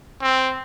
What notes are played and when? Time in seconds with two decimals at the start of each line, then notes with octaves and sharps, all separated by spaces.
0.22 C4